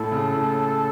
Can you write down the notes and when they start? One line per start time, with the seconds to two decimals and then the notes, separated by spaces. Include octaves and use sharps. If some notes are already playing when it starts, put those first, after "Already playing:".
Already playing: A2 A4
0.12 C#3
0.36 A2